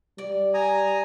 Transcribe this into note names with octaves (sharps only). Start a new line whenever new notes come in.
G3 D5
G#5 A#5 D#6